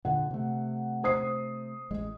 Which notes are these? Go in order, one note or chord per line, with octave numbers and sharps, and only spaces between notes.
A#2 D3 F#5
C3 A3
C5 D#6 C7
A1 G#3